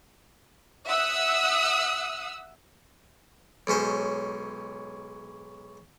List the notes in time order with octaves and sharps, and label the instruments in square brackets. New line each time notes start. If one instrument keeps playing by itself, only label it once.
[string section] E5 F#5 D#6 E6 F#6
[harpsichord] B1 G#2 C#4 C5